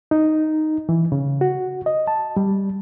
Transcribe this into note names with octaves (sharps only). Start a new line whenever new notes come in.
D#4
E3
C#3
F#4
D#5
A5
G3